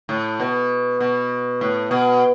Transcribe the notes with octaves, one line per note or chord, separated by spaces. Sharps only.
A2
B2
B2
A2
B2